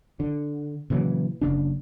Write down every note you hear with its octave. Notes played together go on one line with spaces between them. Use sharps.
D3
A#2 C#3 E3 F#3
F#1 C#3 D4